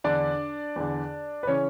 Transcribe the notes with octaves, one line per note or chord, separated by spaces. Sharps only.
E2 D3 D4 D5
E2 D3
B4
C#3 E3 C#4 C#5